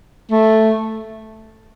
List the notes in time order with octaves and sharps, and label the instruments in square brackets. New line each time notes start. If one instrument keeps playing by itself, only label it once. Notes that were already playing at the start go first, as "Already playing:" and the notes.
[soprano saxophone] A3